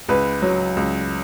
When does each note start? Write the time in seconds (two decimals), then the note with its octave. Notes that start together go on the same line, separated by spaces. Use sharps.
0.08 C#2 B4
0.42 F#3
0.77 C#2